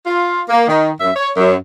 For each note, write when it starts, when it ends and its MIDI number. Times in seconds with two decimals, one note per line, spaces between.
0.07 0.42 65
0.49 0.66 58
0.67 0.91 51
1.01 1.10 42
1.01 1.10 76
1.16 1.30 73
1.37 1.53 42